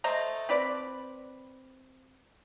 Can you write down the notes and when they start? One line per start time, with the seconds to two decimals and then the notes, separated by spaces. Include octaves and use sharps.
0.04 A3 C5 D#5 A#5
0.49 C4 B4 D5 B5